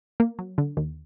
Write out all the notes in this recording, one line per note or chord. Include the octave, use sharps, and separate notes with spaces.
A#3
F#3
D3
D#2